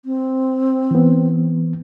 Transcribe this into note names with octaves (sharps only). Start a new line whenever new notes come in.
C4
E3 B3